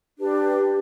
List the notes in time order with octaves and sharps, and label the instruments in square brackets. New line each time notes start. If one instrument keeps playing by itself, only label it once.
[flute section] D4 G4 B4